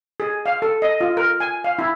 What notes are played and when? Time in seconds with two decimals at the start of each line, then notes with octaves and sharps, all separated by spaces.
0.20 G#4
0.46 F5
0.62 A4
0.82 D#5
1.01 F4
1.17 A#4
1.40 G#5
1.64 F5
1.79 E4